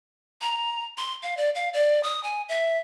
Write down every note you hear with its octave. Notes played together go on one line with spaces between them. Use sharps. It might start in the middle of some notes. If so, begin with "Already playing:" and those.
A#5
C6
F5
D5
F5
D5
D#6
G#5
E5